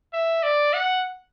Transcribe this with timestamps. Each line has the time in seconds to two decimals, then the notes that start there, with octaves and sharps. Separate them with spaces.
0.13 E5
0.43 D5
0.73 F#5